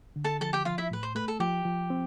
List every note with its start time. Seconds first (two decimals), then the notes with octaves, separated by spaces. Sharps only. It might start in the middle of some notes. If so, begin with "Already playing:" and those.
0.16 D3
0.24 A4 A5
0.41 F3 A4 A5
0.53 G4 G5
0.65 F3 F4 F5
0.78 E4 E5
0.91 A2 B4
1.03 C5
1.15 A3 B4
1.28 A4
1.40 F3 G4
1.65 F3
1.90 C4